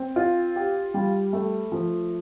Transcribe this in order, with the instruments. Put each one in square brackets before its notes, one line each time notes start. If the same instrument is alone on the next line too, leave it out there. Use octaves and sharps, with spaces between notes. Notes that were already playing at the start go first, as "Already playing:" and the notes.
Already playing: [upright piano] C4
F4
G4
G3
A3
F3